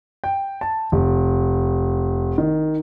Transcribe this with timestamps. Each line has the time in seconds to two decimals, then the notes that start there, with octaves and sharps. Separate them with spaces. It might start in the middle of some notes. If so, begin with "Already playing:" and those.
0.24 G5
0.61 A5
0.92 F1
2.38 D#3